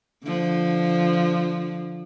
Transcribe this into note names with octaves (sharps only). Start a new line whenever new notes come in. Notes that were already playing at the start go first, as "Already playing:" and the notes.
D3 F3